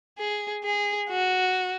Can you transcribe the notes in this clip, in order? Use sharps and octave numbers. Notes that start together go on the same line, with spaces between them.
G#4
G#4
F#4